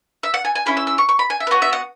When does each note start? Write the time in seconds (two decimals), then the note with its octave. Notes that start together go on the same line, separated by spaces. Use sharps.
0.23 E5
0.34 F#5
0.45 G#5
0.55 G#5
0.66 C#4 E4 G#4 B5
0.77 E6
0.87 E6
0.98 C#6
1.09 C#6
1.19 B5
1.30 G#5
1.40 E5
1.47 B4
1.51 B3 F#4 C#5
1.62 E5
1.73 F#5